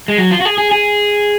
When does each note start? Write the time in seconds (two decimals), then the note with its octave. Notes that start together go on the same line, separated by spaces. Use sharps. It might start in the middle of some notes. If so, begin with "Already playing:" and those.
0.08 G#3
0.18 F#3
0.31 F4
0.40 F#4
0.45 G#4
0.58 G#4
0.71 G#4